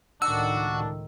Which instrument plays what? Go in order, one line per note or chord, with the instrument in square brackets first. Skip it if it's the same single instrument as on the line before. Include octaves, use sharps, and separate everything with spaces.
[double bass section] C#2 A2 D#3 [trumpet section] D4 [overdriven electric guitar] F#4 [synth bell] E6